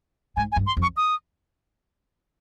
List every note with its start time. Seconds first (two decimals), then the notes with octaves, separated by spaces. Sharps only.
0.36 G#2 G#5
0.52 G#5
0.56 G2
0.67 C6
0.77 F2
0.82 C#6
0.97 D#6